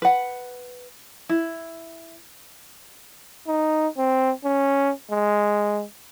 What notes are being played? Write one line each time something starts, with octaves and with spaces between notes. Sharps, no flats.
B4 F#5
E4
D#4
C4
C#4
G#3